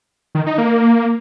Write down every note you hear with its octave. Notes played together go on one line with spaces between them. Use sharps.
D#3
D#4
A#3